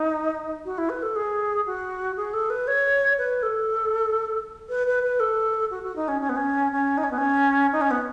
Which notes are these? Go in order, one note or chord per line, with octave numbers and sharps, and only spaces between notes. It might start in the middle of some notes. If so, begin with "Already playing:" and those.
Already playing: D#4
F#4
E4
B4
A4
G#4
F#4
G#4
A4
B4
C#5
B4
A4
B4
B4
B4
A4
F#4
F#4
D#4
C#4
C#4
B3
C#4
C#4
D#4
C#4
B3
C#4
D#4
C#4
B3